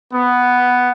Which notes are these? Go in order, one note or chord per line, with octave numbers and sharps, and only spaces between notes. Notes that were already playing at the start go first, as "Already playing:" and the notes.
B3